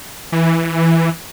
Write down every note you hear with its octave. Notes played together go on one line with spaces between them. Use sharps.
E3